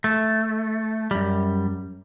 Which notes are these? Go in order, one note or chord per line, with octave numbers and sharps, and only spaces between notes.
A3
F#2 G3